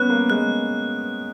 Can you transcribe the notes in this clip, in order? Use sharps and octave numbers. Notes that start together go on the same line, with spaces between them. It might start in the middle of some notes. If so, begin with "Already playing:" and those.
Already playing: B3 C#4 F#6
A#3
G#3 F#6